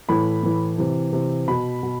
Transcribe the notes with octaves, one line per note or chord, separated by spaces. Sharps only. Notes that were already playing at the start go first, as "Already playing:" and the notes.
A2 E3 B5
A2 E3
C3 E3
C3 E3
B2 B5
B2